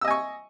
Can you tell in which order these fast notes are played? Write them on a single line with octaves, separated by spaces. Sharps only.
E6 D#5 G#5 C#6